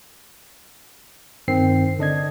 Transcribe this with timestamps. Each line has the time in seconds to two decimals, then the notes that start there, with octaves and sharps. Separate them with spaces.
1.48 G2 D#3 C4 C7
1.99 D3 D4 D#5 G#6